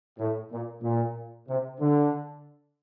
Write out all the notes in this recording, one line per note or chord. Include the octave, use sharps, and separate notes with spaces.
A2
A#2
A#2
C3
D3